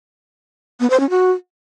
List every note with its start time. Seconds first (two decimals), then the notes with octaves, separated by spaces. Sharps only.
0.80 B3
0.90 C5
1.00 C#4
1.10 F#4